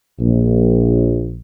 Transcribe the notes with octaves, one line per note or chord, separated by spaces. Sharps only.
A#1